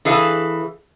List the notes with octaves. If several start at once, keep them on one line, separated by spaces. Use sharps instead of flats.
E3 G#4 A4 F5